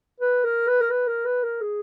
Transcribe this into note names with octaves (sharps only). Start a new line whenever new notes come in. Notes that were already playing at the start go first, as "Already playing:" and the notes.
B4
A#4
B4
A#4
B4
A#4
B4
A#4
G#4